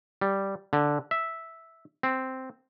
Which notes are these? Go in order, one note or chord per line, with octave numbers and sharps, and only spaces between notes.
G3
D3
E5
C4